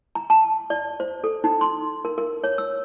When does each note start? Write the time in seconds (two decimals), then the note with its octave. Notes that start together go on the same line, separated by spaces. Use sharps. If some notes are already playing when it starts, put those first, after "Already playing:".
0.15 A#5
0.30 A5
0.70 D5
1.00 C5
1.24 A4
1.44 D#4
1.61 C6
2.05 A#4
2.18 A#4
2.44 C#5
2.58 E6